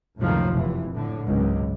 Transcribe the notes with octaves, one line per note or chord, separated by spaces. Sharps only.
C#2 F#2 A2 C3 D#3 F3
F1 E3
A2 D3
F#1 C#2 G#2